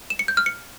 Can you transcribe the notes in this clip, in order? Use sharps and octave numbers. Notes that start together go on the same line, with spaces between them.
E7
C#7
G6
F6
C#7